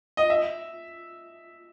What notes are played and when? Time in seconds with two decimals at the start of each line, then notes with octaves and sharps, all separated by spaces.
0.17 D#5
0.30 E5